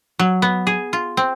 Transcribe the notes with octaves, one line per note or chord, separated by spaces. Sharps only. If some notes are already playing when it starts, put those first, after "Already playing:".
F#3
B3
G#4
F4
C4